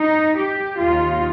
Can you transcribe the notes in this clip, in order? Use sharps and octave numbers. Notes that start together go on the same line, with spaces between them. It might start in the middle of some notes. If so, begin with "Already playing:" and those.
Already playing: D#4
G4
D#2 D#3 F4